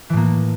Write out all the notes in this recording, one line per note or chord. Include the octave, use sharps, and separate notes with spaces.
A2 E3 A#3